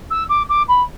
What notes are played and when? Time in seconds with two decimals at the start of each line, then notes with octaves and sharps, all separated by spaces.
0.10 E6
0.29 D6
0.49 D6
0.68 B5